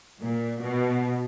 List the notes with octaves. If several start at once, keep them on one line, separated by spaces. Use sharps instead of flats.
A#2
B2